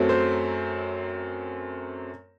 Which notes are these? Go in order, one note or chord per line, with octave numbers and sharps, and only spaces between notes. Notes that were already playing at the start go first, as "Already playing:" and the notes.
Already playing: F#2 F#3 A3 C4
C5